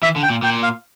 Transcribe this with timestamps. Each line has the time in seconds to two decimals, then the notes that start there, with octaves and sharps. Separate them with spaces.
0.03 E3 E5
0.16 D3
0.23 G5
0.30 A#2
0.42 A#2 G5
0.63 F5